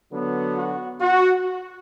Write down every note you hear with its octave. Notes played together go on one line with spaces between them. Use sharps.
D3 F#3 B3
F#4
F#4